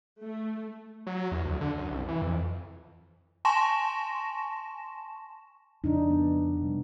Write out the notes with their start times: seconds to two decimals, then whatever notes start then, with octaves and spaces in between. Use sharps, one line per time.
0.23 A3
1.07 F#3
1.32 E2
1.45 D2
1.61 D3
1.78 F#2
1.91 C2
2.08 E3
2.22 F2
3.45 G#5 A5 C6 C#6 A#6 E7
5.84 F2 C#3 D4 D#4
6.10 B3
6.62 C3 G3